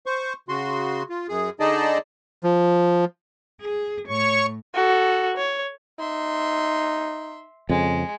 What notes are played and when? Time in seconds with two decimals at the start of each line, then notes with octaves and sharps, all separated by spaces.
0.06 C5 C#6
0.49 C#3 F#4 C6
1.10 F4
1.29 F#2 G#4
1.60 D3 D#4 G#4 D5 D#5 A5
2.44 F3
3.60 G#4
4.08 A2 C#5 C#6
4.75 F#4 A4
5.37 C#5
5.99 D#4 E5 C6
7.69 F2 C#3 G#3